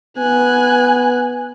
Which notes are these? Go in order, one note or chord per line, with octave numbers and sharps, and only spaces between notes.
B3 G#5 F#6